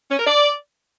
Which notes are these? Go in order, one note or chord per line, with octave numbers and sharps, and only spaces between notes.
C#4
A#4
D5